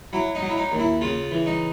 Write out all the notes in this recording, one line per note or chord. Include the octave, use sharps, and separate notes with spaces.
F#3 E4
D#4
F#3
E4
D#4
D#2
E4
C#3 F4
E3
D#4